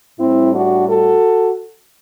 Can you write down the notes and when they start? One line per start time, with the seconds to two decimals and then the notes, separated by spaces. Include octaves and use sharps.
0.19 A2 G3 C4 E4
0.54 D4 F#4
0.88 F#4 A4